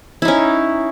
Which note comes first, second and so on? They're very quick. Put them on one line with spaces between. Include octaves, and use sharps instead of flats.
E4 D#4 C#4